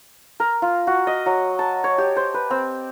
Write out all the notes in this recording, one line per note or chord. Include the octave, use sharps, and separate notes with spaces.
A#4
F4
F#4
D#5
F#3
A5
C#5
G4
C5
B4
C4